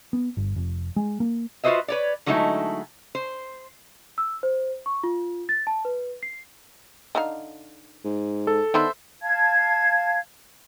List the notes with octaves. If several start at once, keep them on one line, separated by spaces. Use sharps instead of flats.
B3
G1
F1
G#3
A#3
F4 F#4 B4 C5 D#5 E5
B4 C#5 D5
D3 F#3 G#3 A3 D#4 E4
C5
E6
C5
C#6
F4
A6
A5
B4
C7
D3 D#4 F5
G#2
A4
D#3 B3 D4 B4 C5 E5
F5 A5 G#6